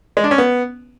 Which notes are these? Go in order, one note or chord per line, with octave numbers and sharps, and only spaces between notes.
G#3
D4
C#4
B3